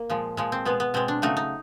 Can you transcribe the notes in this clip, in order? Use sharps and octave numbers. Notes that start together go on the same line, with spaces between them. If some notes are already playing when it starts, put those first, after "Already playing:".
Already playing: A#3
A#2 F3 G#3
A#2 F3 G#3
C4
B2 G#3 B3
B3
B2 G#3 C4
D4
C#3 F#3 A3 D#4
D#4